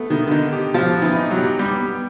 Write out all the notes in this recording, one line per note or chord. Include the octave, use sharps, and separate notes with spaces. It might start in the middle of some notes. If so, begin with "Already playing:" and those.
Already playing: A3 B3
D#3 B3
D3
D#3 D#4
G4
F3 B3
B3
E3
D#4
F#3
G4
G3 B3
B3